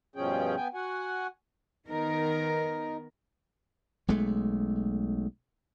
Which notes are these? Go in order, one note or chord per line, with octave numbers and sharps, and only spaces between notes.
G2 B2 F3 C#4 G#4 G5
B3 G5 G#5
F#4 F#5 G#5
D#3 B3 D#4 A#4
B1 G#3 A3